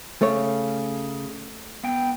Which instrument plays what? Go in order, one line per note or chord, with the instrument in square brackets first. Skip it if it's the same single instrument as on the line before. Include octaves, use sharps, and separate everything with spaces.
[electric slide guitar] C#3 [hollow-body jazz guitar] A3 C#5
[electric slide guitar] B3 G5